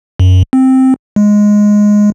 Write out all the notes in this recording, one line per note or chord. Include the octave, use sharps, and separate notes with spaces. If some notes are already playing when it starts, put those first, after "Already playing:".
F#2
C4
G#3